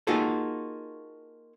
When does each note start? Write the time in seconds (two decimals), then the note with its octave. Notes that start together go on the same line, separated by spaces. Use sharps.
0.07 A#3 D#4 F4 F#4 G#4 A4